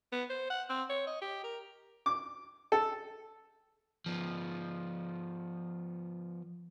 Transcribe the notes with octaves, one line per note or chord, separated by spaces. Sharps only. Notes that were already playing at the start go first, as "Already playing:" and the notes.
B3
C5
F#5
C4
C#5
D#5
G4
A#4
D6
A4
F3 B3